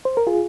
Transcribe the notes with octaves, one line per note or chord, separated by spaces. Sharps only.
C5
A#4
F4 G#4